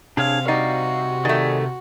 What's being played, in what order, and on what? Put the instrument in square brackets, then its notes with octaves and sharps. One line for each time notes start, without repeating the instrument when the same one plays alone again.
[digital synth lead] C3 [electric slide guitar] D4 G#4 C#5 [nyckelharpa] F5
[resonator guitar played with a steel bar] G3 D#4 [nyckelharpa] F#4 [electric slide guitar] D5 F5
[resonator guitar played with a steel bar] D#3 A3 [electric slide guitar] G#4 D5